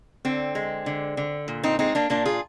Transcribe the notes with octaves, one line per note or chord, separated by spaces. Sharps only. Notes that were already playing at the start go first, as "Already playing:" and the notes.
D3 C4
G#3
D3
D3
A#2
C4 D#4
G#3 C4 D#4
A#3 D4
A#2 A#3 D4
F4 G#4